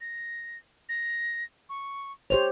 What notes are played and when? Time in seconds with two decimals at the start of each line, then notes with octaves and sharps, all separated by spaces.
0.01 A#6
0.89 A#6
1.69 C#6
2.30 G4 C5 C#5 F7